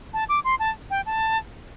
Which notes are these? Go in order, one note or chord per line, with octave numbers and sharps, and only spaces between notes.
A5
D6
C6
A5
G5
A5